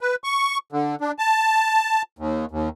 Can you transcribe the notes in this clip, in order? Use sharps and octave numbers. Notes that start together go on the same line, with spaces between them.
B4
C#6
D3
D4
A5
D#2
D#2